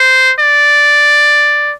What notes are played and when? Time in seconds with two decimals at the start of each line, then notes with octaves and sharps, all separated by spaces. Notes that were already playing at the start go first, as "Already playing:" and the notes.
Already playing: C5
0.39 D5